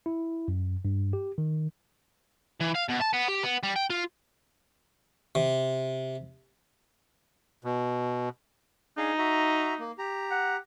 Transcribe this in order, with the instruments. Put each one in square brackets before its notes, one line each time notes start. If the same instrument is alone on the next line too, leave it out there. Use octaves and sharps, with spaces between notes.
[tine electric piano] E4
F#2
G2
G4
D#3
[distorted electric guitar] E3
F5
B2
A5
B3
G4
B3
G3
G5
F4
[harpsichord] C3
[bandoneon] B2
[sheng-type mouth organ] D4 G#4 F5 [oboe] D#4
[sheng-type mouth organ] F#4 E5 A#5
A#3
G4 A#5
[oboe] F#5